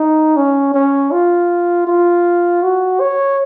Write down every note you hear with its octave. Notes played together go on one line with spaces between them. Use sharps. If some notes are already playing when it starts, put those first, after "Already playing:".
Already playing: D#4
C#4
C#4
F4
F4
F#4
C#5